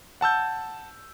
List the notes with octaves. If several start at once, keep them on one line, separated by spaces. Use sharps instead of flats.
F#5 A5 E6 G6